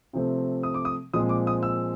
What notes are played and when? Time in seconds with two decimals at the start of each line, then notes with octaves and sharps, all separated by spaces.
0.13 C3 F3 A3 C4
0.63 D#6
0.74 D6
0.85 D#6
1.13 A#2 F3 G#3 C4 D#6
1.29 D6
1.47 D#6
1.63 E6